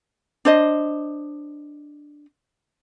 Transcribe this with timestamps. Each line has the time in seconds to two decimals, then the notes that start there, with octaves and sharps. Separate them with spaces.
0.45 D4 C5 D#5